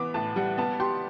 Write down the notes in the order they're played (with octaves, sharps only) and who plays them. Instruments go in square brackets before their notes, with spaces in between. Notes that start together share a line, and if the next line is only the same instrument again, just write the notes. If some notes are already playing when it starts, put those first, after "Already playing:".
Already playing: [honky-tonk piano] E3 B3 [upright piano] D6
[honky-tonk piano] A2 [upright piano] A5
[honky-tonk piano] G3 [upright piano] F#5
[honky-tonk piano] B3 [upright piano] A5
[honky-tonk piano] G4 [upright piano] C6